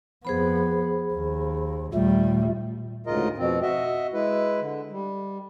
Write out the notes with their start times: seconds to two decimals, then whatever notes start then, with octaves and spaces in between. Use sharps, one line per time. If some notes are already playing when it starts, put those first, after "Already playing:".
0.25 F2 B3 G#4 C5 B5
1.13 D#2
1.94 D#2 A#2 G3 A3
3.06 D2 G#2 C#3 F4 A#4 D#5
3.38 F2 B2 C4
3.62 F#4 D#5 E5
4.13 G#3 E4 B4
4.61 D3
4.91 G3